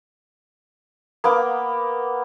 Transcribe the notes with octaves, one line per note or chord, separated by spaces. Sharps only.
A#3 B3 D6